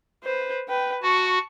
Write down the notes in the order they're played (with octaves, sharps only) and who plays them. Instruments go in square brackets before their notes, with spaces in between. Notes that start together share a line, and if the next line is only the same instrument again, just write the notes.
[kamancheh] B4 C5
B4 G5
[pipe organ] F#4 [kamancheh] A5 C#6